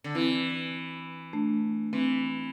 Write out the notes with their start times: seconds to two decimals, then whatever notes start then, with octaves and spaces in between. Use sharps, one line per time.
0.04 D3
0.15 E3 C4 E4
1.33 A3 D4
1.93 E3 C4